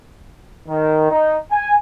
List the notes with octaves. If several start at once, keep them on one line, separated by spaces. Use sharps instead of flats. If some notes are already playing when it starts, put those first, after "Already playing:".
D#3
D#4
G#5